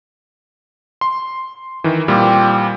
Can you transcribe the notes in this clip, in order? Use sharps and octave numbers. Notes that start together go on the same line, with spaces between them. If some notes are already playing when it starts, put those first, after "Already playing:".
C6
D#3 E3
A#2 G3 C4 G4